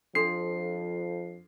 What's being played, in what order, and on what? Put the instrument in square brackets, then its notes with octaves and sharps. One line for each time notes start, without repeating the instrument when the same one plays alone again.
[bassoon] F2 [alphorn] F3 [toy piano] D4 A4 C6 [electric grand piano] C7